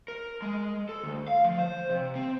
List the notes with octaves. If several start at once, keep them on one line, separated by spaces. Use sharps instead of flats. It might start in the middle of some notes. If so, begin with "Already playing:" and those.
A#4
G#3
A4
D2
F5
F3
C5
C3
C4